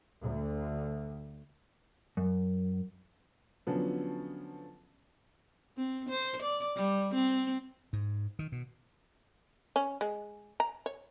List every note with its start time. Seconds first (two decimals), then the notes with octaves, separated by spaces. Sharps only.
0.20 D2
2.17 F#2
3.67 D3 F3 F#3 B3 C#4 A4
5.77 C4
6.10 C5
6.43 D5
6.77 G3
7.15 C4
7.93 G#2
8.39 D#3
8.52 B2
9.76 C#4
10.01 G#3
10.60 A#5
10.86 C#5